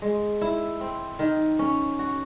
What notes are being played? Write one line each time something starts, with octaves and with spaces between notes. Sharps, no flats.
G#3
E4
C4
D#3
C#4
F#4